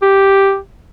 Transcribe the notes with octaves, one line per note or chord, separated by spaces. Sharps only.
G4